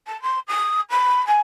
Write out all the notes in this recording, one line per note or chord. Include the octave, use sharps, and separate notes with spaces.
A5
C6
D#6
B5
G#5